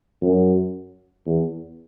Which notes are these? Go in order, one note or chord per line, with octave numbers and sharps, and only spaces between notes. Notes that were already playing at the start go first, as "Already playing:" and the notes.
F#2
E2